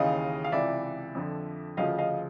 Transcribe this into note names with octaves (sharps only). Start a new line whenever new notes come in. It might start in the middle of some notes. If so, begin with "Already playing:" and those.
Already playing: D#2 C#3 E3 D#5 F5
F5
C#2 C3 E3 D5 E5
F2 D3 F3
D2 C#3 F3 D#5 F5
D#5 F5